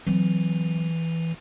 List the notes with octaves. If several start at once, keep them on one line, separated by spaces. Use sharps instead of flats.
E3 F#3 C4